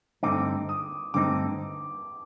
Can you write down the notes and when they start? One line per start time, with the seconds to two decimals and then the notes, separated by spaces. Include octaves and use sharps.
0.23 G2 D3 A3 C4 D#4 D6
0.69 D#6
1.14 G2 D3 A3 C4 D#4 D6